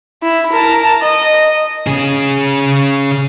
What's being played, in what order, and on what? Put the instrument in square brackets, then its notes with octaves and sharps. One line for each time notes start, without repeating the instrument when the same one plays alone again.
[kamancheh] E4
A#4 A5
D#5
[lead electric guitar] C#3 G#4